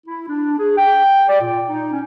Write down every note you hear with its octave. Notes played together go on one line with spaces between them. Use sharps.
E4
D4
G#4
G5
D5
A#2
D#4
C#4